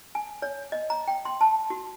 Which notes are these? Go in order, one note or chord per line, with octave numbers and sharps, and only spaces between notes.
G#5
C#5
D#5
A#5
G5
C6
A5
F#4